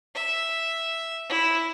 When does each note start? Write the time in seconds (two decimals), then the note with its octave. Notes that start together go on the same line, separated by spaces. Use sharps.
0.15 E5
1.30 E4